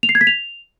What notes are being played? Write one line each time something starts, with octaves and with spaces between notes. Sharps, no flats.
F7
C7
G#6
B6
F7